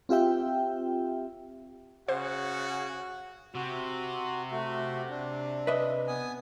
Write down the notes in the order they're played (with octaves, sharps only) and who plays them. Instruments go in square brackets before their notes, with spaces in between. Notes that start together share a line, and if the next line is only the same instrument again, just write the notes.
[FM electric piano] C4 F4 G4 E5 G5
[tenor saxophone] C#3 [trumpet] F#4 [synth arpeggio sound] C5 [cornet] F#5
[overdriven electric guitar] C3 [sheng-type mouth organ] F#4
[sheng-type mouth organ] A3 F#4
D4
[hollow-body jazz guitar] B4 D#5 E5
[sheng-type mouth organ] B3 G#5 D#6